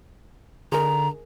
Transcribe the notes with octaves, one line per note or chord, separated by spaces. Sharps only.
D3 G#4 A#4 A#5